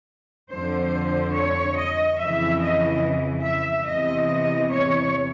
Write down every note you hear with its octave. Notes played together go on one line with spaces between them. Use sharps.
F2 D3 C5
C#5
D#5
F2 C#3 E3 E5
D#5
E5
E2 C3 E3 D#5
C#5